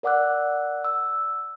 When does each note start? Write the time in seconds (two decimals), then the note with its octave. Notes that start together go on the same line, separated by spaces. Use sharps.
0.03 A#4 D5 F#5 D6 E6 F#6
0.84 E6